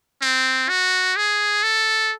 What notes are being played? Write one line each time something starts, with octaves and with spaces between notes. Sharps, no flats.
C4
F#4
G#4
A4